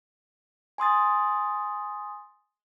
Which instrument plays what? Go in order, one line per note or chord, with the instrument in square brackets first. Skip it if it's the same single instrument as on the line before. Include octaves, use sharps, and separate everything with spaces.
[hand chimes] G#5 C6 D#6 A6